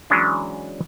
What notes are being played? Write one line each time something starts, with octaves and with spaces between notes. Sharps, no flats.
E3 F#3 G#3 C#4 D4